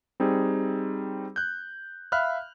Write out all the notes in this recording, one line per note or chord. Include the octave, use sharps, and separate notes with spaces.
G3 C4 D#4 G#4
F#6 G6
E5 F5 B5 F6 F#6